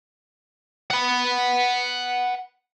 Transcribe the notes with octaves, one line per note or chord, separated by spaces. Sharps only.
F#5 B5